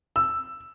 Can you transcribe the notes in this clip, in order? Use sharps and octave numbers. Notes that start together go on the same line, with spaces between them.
E6